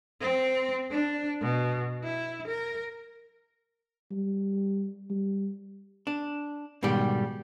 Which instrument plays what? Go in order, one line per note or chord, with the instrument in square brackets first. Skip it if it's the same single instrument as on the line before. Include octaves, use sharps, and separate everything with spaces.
[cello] C4
D4
B2
E4
A#4
[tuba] G3
G3
[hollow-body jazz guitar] D4
G#2 B2 D#3 G3 G4